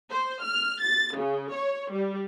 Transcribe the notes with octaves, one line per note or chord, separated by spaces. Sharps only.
C5
F6
A6
C#3
C#5
G3